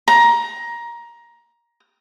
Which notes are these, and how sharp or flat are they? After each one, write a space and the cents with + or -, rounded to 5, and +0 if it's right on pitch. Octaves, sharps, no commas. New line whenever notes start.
A#5 +15